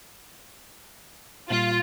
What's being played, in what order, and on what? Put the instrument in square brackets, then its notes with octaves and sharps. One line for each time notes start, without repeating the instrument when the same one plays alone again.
[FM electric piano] A#2 G3 [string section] F4